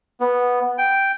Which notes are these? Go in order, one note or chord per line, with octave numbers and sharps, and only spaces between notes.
B3
G5